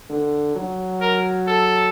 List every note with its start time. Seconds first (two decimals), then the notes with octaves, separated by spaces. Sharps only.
0.09 D3
0.56 F#3
1.01 A#4
1.47 A4